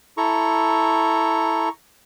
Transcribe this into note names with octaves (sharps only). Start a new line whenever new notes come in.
E4 A4 A#5 C#6